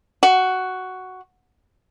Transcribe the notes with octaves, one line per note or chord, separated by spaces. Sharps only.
F#4